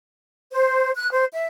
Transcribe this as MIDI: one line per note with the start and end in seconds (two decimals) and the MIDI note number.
0.52 0.90 72
0.97 1.10 90
1.10 1.24 72
1.33 1.47 76